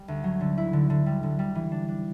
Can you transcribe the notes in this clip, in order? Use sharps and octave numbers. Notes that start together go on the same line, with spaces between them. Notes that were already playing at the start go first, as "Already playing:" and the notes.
Already playing: G3
D2
F#3
D3
E4
D3
D3
G3
D3
G3
E3
D4
D4